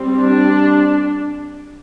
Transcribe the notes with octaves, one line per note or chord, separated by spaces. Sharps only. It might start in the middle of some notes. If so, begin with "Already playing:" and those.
Already playing: G3 C4
D4